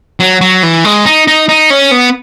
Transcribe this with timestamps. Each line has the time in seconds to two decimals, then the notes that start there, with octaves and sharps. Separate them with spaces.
0.20 F#3
0.41 F#3
0.63 E3
0.85 G#3
1.05 D#4
1.27 D#4
1.49 D#4
1.70 C#4
1.91 B3